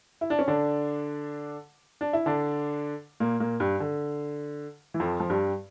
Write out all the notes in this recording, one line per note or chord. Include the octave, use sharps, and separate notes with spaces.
E4
D4
C#4
D3 D4
D4
E4
D3 D4
A#2 A#3
A#2 A#3
G2 G3
D3
E3
F2 F3
F3
G2 G3